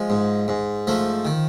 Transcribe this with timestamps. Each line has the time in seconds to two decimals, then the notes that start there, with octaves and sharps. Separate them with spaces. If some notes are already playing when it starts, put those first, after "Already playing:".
Already playing: F3 G#3
0.10 G#2
0.48 G#2
0.87 F3 A3
1.25 D#3